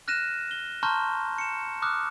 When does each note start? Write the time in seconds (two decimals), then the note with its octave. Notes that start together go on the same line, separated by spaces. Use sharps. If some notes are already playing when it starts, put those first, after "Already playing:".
0.08 F6 F#6 A#6 D#7 E7
0.51 G7
0.83 A5 A#5 C6 C#6 F6 G6
1.38 C#7 E7
1.82 D6 D#6 F6 F#6